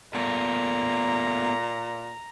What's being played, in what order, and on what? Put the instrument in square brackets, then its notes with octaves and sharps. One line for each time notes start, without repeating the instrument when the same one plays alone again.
[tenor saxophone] A#2 [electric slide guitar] A3 B3 A5 [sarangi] A#5